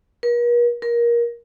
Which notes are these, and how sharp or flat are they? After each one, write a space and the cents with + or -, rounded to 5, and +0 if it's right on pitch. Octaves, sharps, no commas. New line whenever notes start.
A#4 +45
A#4 +20